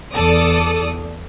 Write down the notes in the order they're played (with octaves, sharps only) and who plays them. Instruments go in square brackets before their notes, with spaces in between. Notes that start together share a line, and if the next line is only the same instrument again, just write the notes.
[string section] E2 A4 D5 D#6